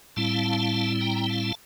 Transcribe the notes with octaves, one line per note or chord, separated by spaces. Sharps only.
A2 G3 C4 E4 F5 A5
G5 A#5
F5 A5